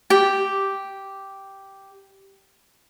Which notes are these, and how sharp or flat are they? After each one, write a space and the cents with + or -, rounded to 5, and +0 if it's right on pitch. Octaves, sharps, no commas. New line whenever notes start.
G4 -5 G5 +0